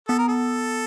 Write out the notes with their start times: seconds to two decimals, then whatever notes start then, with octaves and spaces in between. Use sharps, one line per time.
0.08 B3 A4
0.19 A#4
0.28 A4